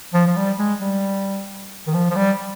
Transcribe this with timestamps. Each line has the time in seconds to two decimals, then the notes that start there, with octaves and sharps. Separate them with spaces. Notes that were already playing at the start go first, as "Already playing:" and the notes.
0.13 F3
0.27 F3
0.36 G3
0.58 G#3
0.81 G3
1.87 D#3
1.94 F3
2.10 F3
2.16 G3